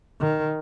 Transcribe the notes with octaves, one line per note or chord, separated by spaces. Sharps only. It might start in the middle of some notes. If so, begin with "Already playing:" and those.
D#3